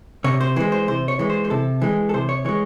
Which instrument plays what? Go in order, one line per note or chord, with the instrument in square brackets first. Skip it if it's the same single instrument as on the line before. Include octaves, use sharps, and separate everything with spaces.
[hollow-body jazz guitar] C3 C#5
C5
E3 G#3 C5
C5
C3 C5
C#5
E3 G#3
C5
C5
C3 A4
E3 G#3
A4
C3 C5
C#5
E3 G#3 C#5